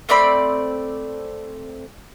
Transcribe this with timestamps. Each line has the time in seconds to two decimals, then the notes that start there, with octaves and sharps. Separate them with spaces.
0.09 A3 C4 D5 B5